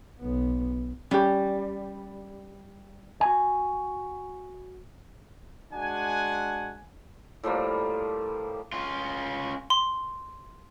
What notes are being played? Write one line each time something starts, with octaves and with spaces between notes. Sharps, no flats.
B1 B3
G3 C#4 G4
F#4 G#5
G#3 D4 F#4 F#5 G#5
A2 F3 G3 A#3
C#4 F4
C6